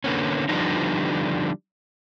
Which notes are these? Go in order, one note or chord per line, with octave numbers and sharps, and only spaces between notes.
D3 A#3 B3 C#4
D3 F3 G3 B3 D4 D#4